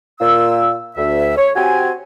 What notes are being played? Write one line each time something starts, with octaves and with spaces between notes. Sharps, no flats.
A#2 F4 E6
D2 E5
C#5
C4 F#4 G4 C5 G#5